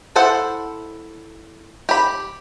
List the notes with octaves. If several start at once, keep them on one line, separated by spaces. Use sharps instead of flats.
E4 A4 C5 F#5
G4 B5